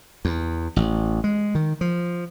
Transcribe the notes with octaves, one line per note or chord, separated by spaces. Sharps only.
E2
A1
G#3
D#3
F3